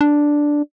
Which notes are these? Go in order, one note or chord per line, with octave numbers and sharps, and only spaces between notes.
D4